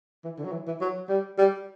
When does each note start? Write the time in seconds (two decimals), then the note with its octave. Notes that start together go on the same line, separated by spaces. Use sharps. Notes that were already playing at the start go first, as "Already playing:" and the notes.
0.24 E3
0.38 D3
0.45 F#3
0.52 E3
0.67 E3
0.81 F#3
1.09 G3
1.38 G3